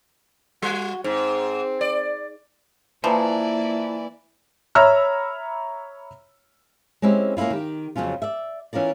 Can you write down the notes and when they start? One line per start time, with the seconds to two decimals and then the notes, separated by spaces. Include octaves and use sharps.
0.62 G3 F#4
1.04 G#2 C4
1.81 D5
3.04 E3 F3 A#3 E4 B4 D5 A5 A#5
4.75 C#5 E5 A#5 B5 E6 F6
7.02 G#3 C4 C#4 E4 G4
7.37 A#3 C#4 D4 E4 F4
7.50 D#3 G4
7.96 F2 C#3 F#3 C#4 F4
8.22 D5 E5
8.73 E3 C#4 F4 A#4 D5